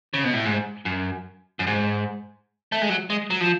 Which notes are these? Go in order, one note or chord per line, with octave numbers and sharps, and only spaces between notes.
C#3
B2
A2
G#2
F#2
F#2
G#2
A3
G#3
F#3
G#3
F#3
F3